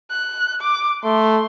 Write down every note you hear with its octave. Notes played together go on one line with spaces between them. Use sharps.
F#6
D6
A3 C6